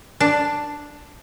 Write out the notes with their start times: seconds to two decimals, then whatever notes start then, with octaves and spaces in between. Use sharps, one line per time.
0.20 D4